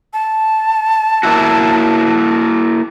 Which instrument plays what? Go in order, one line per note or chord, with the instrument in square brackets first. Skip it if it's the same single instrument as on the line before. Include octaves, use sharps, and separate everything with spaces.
[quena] A5
[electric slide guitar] A#3 E4 F#4